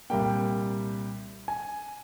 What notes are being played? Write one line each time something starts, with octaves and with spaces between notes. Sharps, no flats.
C2 A#2 G3 A#3 G5
G#5